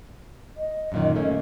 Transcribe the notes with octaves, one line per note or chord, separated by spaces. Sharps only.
D#5
F#2 A#2 D#3
A3 A#3 C#4